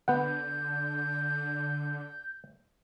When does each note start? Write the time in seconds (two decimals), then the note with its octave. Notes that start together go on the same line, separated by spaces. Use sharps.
0.08 D3 B3 F#5 G6